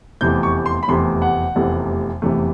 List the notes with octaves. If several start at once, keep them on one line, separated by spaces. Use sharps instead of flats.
F1 E2 C3 E3 A3 G6
C#6
C6
B5
F1 E2 C3 E3 A3 C6
F#5
F1 E2 C3 E3 A3
F1 E2 C3 E3 A3